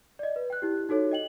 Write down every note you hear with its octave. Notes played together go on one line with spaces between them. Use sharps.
D5 D#5
B4
G5 F#6
E4 G4
D#4 F#4 A4 C#5
D#5 G5 F#7